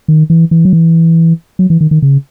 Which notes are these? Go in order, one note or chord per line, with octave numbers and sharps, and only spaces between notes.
D#3
E3
E3
F#3
E3
F#3
E3
D#3
D#3
C#3